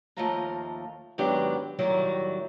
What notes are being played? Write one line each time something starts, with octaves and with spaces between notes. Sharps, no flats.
D#2 F3 A3 D#5 F5 A#5
G#2 D#3 F#3 B3 D4 G4
A2 D#3 F#3 G3 E4